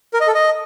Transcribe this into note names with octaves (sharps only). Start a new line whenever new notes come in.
A#4
D#5
A4
D#5